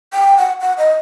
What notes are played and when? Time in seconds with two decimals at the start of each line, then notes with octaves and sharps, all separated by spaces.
0.13 G5
0.38 F#5
0.61 F#5
0.78 D#5